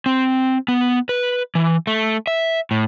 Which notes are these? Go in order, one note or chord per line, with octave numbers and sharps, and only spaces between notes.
C4
B3
B4
E3
A3
E5
A2